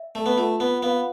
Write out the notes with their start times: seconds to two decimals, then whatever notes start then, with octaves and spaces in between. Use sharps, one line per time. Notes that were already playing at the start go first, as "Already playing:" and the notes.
Already playing: E5
0.15 A3
0.26 B3
0.37 A3 F4
0.60 B3
0.83 B3 F5